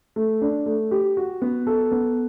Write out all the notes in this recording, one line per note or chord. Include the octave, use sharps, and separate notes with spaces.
A3
D4
A3
G4
F#4
B3
A4
B3